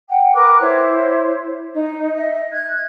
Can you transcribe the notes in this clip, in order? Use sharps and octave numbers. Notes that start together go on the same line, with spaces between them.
F#5 G5
A#4 B4 D6 F#6
E4 C5 C#5
D#4
D#5 E5
F#6 G#6